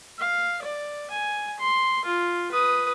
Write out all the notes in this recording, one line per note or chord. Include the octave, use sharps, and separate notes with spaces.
F5
D5
G#5
C6
F4
B4 D#6